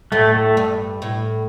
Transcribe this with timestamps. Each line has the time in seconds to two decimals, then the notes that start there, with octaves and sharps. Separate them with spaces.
0.12 A2 A3
0.35 A3
0.57 G2
1.02 A2